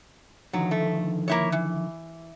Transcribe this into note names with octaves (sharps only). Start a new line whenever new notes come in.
D3 D#3 F3 F#3
A3
A#3 E4 C#5
E3